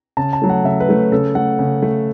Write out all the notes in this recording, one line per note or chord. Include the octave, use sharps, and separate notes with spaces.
C#3 A5
A5
F#3 A3
F#5
C#3 E5
B4
F#3 A3
C#3 A4
A3 F#5
C#3
A3